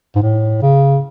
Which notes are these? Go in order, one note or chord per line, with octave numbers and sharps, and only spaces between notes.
G#2
A2
C#3